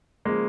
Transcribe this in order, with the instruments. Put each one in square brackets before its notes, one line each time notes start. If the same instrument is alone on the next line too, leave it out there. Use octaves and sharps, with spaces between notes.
[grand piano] C#3 F3 G#3 A#3